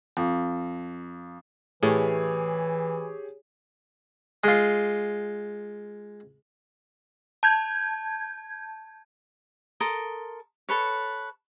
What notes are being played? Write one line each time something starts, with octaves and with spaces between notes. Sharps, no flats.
F2
A2 E3 G4 G#4 C#5
G#3 F4
A5 G6 G#6
A4 A#4 C6 D#6
A4 B4 C#5